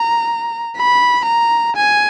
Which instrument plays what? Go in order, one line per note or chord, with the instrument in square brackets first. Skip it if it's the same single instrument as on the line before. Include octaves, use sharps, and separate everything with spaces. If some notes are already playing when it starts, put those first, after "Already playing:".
Already playing: [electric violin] A#5
B5
A#5
G#5